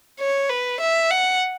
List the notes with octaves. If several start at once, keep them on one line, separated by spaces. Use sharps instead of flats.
C#5
B4
E5
F#5